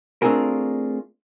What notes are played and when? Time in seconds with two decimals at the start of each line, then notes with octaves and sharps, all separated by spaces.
0.22 A3 C4 D4 F4 G#4 A#4